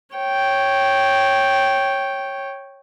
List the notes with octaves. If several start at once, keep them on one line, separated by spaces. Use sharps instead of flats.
C#5 G5